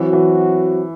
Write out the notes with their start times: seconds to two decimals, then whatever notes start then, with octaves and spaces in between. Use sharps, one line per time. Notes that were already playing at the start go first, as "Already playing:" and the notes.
Already playing: E3 F#3 C4 F#4
0.13 E3